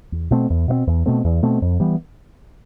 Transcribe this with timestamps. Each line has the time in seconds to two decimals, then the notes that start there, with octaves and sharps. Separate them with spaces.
0.12 E2
0.30 B2 A3 C4
0.50 E2
0.68 B2 A3 C4
0.87 E2
1.06 B2 A3 C4
1.24 E2
1.42 B2 A3 C4
1.62 F2
1.80 E3 G3 B3